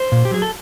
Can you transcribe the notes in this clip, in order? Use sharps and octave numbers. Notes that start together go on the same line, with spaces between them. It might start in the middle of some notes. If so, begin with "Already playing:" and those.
Already playing: C5
A#2
G4
F#3 G#4
A4